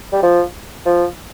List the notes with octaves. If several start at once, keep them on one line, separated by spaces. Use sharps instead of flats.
G3
F3
F3